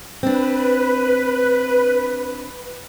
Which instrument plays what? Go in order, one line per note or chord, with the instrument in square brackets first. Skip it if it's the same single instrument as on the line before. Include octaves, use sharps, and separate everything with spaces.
[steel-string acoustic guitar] C4 D4 [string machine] B4